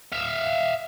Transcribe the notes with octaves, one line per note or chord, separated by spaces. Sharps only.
E5 F5